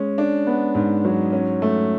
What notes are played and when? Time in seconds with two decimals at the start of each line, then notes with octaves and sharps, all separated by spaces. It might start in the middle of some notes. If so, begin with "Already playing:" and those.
Already playing: G#3 C#4
0.18 D4
0.47 B3
0.75 G#2
1.05 F#3
1.32 C#4
1.62 A3